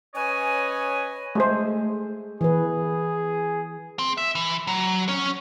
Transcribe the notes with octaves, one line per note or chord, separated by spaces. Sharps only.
C#4 B4 C#5 D#5 G#5
G#3 A3 G#4 C5
E3 G#4 B4
C4
E5
E3
F#3
C#4 C#5